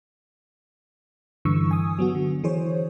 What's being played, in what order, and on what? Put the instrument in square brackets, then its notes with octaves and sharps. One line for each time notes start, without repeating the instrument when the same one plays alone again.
[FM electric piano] G2 D3 E3 C#6 E6
G#5 D#6
F#3 B3 F#4
D3
E3 G#4 C5 C#5